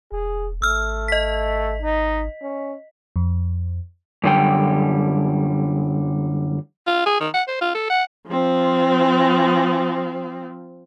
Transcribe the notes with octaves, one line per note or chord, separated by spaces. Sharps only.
E1 G#4
G#1 A3 E6 F6
D#5 B6
D#4
C#4
F2
F#2 D3 G3 G5
F4
G#4
D#3
F#5
C5
F4
A4
F#5
F3 C4